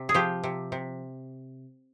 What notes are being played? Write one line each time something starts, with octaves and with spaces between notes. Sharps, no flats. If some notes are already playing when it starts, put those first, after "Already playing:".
Already playing: C3
G#4
F3 G4
C3
C3